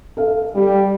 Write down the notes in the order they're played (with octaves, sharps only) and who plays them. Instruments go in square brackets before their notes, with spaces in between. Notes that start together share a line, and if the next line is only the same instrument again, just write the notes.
[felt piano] A4 F5
[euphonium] G3 [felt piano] G4